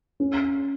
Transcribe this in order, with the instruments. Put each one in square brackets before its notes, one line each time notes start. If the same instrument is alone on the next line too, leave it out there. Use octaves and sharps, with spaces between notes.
[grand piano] C#4